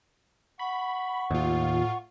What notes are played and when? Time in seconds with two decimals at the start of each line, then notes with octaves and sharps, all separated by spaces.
0.59 F#5 B5 C#6
1.31 D#2 A2 F4